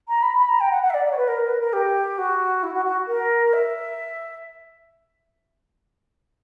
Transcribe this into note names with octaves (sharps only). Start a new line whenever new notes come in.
A#5
B5
B5
A#5
G5
F#5
F#5
E5
D5
D5
C#5
B4
A#4
B4
A#4
G4
F#4
E4
F#4
F#4
A#4
E5